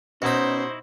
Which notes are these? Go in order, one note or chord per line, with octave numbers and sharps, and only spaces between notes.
B2 C#4 D#4 E4 F#4 C5 B5